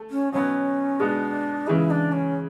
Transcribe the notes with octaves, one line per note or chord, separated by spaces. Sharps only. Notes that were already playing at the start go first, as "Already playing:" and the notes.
Already playing: A3 A4
C#4
B2 F#3 B3 C#4
B2 G#3 B3 D4
C#3 E3 G#3 E4
D4
C#4